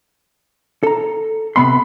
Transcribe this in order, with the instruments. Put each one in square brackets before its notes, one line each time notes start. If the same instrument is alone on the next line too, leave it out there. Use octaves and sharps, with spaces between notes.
[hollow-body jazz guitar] A4 A#5
[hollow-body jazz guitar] C3 B3 C6 [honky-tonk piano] B5